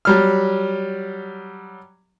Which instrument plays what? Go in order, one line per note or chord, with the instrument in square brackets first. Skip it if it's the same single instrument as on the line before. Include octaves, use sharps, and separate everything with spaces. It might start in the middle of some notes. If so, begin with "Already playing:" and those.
[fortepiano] F#3 G3 F6